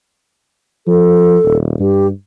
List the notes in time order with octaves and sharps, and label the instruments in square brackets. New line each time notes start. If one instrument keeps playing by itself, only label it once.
[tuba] F3 [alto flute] A4
[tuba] D#1
[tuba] G2 [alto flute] G4